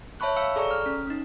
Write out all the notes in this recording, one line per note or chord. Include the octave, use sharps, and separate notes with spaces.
C#5 E5 A5 B5 C#6 F#6
C#5 F5 E6 C#7
G#4 A4 D5 A#5 C#6
F6
C#4
C#4 D#4